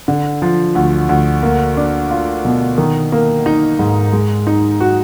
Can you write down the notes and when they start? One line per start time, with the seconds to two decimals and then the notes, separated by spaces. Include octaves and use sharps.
0.08 D3
0.42 F3
0.75 D2
1.09 D2
1.43 A#3
1.77 D4
2.11 F4
2.45 B2
2.78 D#3
3.12 A#3
3.46 D#4
3.79 G#2
4.13 G#3
4.47 D#4
4.80 F#4